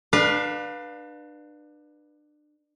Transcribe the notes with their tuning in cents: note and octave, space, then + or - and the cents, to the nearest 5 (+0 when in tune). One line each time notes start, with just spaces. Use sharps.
D4 +30 B4 -15 F5 +25